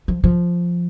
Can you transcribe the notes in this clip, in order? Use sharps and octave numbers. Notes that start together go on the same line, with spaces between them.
F3
F3